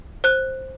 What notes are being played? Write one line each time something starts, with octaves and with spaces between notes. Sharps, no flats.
C5 F#6